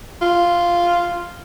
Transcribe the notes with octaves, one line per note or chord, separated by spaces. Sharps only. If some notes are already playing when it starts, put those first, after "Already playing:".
F4